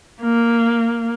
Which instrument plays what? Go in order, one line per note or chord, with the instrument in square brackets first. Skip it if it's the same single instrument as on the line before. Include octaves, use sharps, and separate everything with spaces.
[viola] A#3